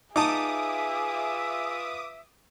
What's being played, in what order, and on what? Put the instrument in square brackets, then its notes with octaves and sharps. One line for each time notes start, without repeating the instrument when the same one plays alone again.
[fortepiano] D#4 A5 [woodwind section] F4 B4 E5 [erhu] G#4 [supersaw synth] D6 D#6